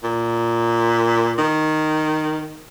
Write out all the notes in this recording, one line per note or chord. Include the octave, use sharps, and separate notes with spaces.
A#2
D#3